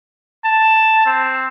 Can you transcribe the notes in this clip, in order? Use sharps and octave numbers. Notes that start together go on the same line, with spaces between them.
A5
C4